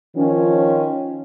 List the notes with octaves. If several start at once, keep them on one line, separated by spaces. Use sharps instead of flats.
D#3 F3 C#4